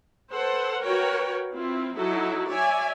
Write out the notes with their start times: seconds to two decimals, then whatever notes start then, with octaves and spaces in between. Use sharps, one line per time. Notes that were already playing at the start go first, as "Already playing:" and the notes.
0.31 A4 B4 C5 F#5
0.81 F#4 A#4 B4 C#5 G5
1.53 C4 E4 F4
1.95 F#3 D#4 E4 F#4 A4
2.48 C#5 D5 E5 G#5